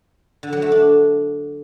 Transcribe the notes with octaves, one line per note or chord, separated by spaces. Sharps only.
D3
F#3
A3
D4